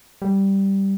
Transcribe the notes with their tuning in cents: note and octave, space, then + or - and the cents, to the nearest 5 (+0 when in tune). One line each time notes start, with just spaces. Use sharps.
G3 -5